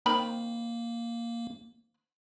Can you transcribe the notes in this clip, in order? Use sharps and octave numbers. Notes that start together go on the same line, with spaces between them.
D#3 A#3 C4 B5